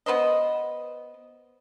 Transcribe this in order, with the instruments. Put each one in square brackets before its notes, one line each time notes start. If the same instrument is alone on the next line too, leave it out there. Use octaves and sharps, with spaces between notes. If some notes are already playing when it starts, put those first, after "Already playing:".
[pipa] B3 B4 C5 D#5